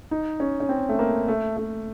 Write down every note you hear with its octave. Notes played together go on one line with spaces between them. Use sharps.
D#4
C#4
C#4
C4
A3
A#3
A3
A3